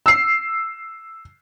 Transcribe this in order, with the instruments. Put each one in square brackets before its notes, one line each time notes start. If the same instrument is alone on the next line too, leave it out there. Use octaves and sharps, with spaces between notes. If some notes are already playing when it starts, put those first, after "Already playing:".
[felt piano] E6 C7